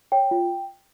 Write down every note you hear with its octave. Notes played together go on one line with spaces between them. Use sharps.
C#5 G5
F4